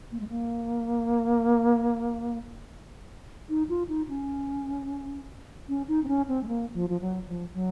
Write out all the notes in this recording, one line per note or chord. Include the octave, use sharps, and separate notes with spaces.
A#3
G#3
A#3
D#4
F4
D#4
C#4
C#4
D#4
C4
C#4
C4
G#3
A#3
F3
F3
F#3
F3
F#3